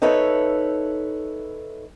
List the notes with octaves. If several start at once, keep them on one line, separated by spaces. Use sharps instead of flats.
D#4 A4 B4 C#5 E5